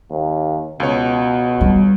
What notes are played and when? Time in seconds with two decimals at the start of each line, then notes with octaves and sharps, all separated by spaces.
0.10 D#2
0.80 C#2 B2 C#5
1.61 G3